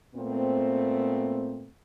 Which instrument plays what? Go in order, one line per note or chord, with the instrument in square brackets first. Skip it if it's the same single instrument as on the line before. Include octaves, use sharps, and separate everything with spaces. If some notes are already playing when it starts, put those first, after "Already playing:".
[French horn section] A#2 A3 B3 C4